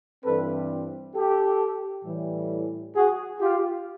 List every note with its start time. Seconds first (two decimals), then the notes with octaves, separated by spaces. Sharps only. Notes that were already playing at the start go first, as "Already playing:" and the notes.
0.24 G2 E3 G3 C4 A4 B4
1.15 G4 A4
2.05 A2 E3 G3
2.95 F#4 G#4
3.41 F4 G4